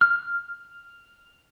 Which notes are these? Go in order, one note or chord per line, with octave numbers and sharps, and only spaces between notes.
F6